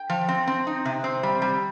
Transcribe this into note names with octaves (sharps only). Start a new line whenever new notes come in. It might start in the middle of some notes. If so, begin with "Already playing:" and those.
Already playing: G5
F3
C4
C4
D#4
C3
C4
G3
G3